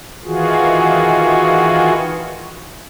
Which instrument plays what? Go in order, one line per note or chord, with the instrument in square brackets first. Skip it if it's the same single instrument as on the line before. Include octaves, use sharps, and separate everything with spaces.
[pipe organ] D#3 E3 F4 F#4 G#4